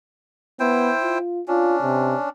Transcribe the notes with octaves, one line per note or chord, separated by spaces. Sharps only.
B3 E4 C5 G5
F4
C#4 D4 F4
C3